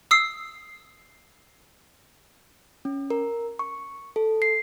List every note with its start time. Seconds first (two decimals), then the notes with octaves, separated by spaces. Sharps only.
0.11 D#6 E6 C7
2.85 C#4
3.10 A#4
3.59 C#6
4.16 A4
4.42 C7